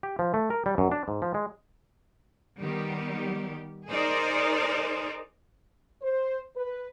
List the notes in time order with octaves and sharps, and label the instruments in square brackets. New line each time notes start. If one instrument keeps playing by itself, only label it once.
[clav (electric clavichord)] G4
F3
A3
A#4
G3
F#2
D4
G#2
F3
G#3
[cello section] D#3 G3 B3 G4
D#4 G#4 A#4 C5 D5
[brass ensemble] C5
B4